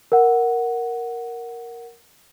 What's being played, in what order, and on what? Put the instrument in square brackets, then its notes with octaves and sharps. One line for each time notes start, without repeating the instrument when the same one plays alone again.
[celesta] A#4 F#5